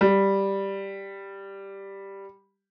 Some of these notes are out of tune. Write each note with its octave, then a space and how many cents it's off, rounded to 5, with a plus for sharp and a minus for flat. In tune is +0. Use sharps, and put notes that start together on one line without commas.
G3 +0